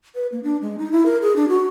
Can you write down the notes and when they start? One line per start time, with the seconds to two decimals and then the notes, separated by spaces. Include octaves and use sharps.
0.15 B4
0.32 A#3
0.44 D4
0.62 G#3
0.78 D#4
0.92 E4
1.06 A#4
1.22 G#4
1.36 D4
1.49 F#4